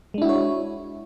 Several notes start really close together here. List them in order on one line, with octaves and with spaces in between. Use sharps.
G#3 D4 E4 F#4 C#5